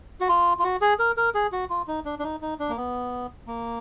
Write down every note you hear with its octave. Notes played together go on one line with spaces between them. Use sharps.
F#4
F4
F4
F#4
G#4
A#4
A#4
G#4
F#4
F4
D#4
D4
D4
D#4
D#4
D4
A#3
B3
A#3